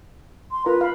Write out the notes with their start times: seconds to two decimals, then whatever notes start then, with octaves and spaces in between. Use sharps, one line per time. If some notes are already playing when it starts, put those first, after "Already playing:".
0.51 C6
0.66 F4 A#4 B4 A#5
0.81 F5 B5